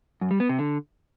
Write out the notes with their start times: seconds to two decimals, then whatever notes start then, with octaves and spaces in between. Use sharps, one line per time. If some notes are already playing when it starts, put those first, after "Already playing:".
0.21 F#2
0.31 G3
0.40 B3
0.49 C3
0.59 D3